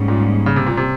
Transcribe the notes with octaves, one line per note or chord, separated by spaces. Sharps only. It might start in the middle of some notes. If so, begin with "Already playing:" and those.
Already playing: G#2 G3 A#3 C#4
A#2
C#3
C3
A#2
C3